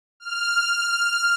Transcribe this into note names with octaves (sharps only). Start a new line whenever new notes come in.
F6